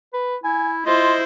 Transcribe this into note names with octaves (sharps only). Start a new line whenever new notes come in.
B4
E4 G#5
E4 F4 C5 D#5